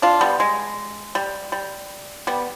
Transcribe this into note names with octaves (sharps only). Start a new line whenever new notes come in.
D4 F4
G3 B3
G#3
G3
G3
G3 B3